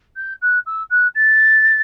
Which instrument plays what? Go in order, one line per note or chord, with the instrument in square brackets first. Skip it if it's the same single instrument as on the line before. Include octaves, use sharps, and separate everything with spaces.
[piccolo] G6
F#6
E6
F#6
A6